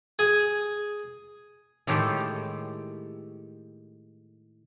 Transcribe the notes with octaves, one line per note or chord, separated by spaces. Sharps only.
G#4
A2 D#3 G#3 G4 A4